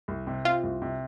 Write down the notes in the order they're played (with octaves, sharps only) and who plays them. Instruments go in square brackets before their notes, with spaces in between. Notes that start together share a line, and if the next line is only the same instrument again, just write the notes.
[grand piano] C2
C3
[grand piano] C4 [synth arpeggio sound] F4
[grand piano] C2
C3